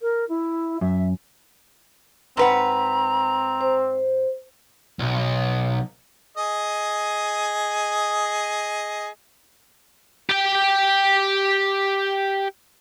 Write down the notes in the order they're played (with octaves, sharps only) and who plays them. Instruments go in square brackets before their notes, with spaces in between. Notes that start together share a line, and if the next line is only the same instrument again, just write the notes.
[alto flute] A#4
E4
[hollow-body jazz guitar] F#2 [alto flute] E5
[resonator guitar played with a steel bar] G#2 B4 F#5 [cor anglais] C4 [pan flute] A#5
[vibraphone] C5
[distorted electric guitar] B1
[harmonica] G#4 D#5
[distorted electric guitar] G4 G5